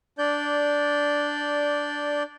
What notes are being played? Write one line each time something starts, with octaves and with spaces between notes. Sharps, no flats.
D4 D5 G6